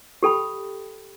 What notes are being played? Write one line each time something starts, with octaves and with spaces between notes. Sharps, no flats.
G4 A4 G5 B5